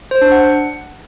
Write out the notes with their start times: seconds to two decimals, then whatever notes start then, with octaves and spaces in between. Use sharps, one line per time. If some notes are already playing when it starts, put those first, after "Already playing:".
0.11 C5
0.21 D4
0.32 F#5